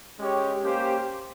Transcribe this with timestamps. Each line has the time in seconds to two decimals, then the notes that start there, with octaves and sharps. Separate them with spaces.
0.18 G#3 C#4 G4 C#5
0.61 A#3 C#4 G4 C5